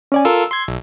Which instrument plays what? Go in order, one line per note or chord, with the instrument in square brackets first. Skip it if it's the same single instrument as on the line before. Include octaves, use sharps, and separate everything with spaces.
[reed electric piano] C#4 D5 G#5
[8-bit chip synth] F4 A4 A#4 [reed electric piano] E6
[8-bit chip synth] C6 G#6
B1